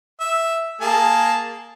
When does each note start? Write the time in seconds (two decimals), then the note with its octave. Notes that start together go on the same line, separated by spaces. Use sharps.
0.20 E5
0.81 A#3 G#4 A5